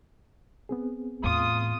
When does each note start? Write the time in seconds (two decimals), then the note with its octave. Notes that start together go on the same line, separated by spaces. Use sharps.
0.69 B3 C4 G#4
1.24 E2 A2 F4 D#6